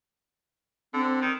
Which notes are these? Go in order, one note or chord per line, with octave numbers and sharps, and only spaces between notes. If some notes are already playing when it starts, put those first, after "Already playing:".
D3 C4
D#3